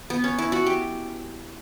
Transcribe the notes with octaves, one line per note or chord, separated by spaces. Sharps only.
B3
C#4
E4
F#4
G4